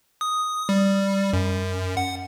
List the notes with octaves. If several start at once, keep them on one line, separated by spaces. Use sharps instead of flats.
D#6
G3
F#2
F#5